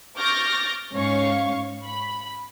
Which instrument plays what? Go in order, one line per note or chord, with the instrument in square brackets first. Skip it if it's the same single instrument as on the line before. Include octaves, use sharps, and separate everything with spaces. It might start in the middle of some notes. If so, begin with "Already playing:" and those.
[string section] C#6 D6 F6 G6 A6 A#6
G#2 C#4 C#5 F5 C#6
B5